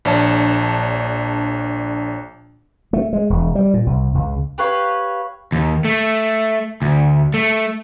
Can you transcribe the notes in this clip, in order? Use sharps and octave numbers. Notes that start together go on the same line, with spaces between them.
A#1 D4 C#5 A5
A3
G#3
E1
G3
A#2
C2
C#2
G4 B4 C#5 F5
D#2
A3
D2
A3